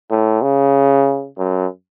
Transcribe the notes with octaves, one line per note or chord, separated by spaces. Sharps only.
A2
C#3
F#2